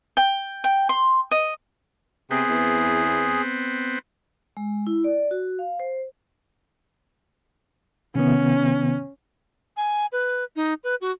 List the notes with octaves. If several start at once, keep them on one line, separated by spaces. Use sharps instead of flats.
G5
G5
C6
D#5
C3 B3 C4 G#4
E2
G#3
E4
D5
F#4
F5
C5
C3 D#3 B3 C#4
G#5
B4
D#4
B4
F#4